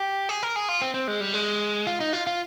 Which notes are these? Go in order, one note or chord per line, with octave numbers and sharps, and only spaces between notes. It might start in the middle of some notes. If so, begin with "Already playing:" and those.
Already playing: G4
G#4
A#4
G#4
F4
C4
C4
G#3
G3
G#3
F4
D#4
F4
F4